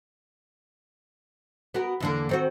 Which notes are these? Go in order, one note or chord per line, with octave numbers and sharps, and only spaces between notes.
B3 F#4 A#4
E2 D3 A#3
D#3 C4 F#4